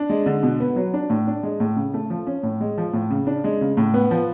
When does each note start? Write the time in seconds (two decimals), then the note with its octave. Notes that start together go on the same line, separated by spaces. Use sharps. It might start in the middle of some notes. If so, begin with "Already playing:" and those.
Already playing: D4
0.10 G#3
0.26 D3
0.43 B2
0.60 B3
0.76 F#3
0.94 D4
1.10 A2
1.27 D4
1.43 G#3
1.60 A2
1.76 C#3
1.94 A3
2.10 F3
2.27 C#4
2.43 A2
2.61 G#3
2.78 F3
2.93 A2
3.10 C#3
3.27 D4
3.44 G#3
3.61 C#3
3.77 A2
3.94 B3
4.11 F3